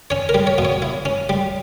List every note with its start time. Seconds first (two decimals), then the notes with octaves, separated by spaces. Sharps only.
0.10 C#4 C#5
0.29 A#4
0.34 G3
0.47 C#5
0.58 B2
0.65 C#5
0.82 E4
1.05 C#4
1.29 G3